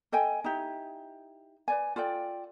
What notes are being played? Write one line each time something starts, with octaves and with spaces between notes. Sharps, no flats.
A4 D#5 G5 G#5
D#4 E4 G4
B4 D5 G#5
F4 A4 D5 G5